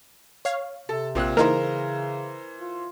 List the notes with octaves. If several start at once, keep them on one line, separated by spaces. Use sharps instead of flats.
C#5 F5
C3 A4
A#1 A#2 C4 F4 F#6
C#3 E3 A#3 D#4 E4 A#4 C5
F4